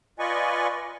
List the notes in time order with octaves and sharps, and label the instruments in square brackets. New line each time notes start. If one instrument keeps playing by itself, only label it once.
[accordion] F4 B4 D5 D#5 G#5 C#6